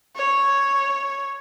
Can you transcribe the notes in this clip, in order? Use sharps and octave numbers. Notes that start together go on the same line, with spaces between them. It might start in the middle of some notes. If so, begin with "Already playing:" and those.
C#5